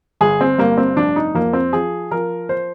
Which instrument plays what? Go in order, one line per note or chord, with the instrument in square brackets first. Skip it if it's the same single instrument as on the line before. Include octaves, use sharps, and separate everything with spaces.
[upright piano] G1 G#4
C4
G2 A#3
C4
F1 D4
D#4
F2 A#3
C4
F3 G#4
F3 A#4
C5